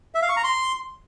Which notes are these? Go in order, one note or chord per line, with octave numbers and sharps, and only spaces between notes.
E5
F5
C#6
A#5
C6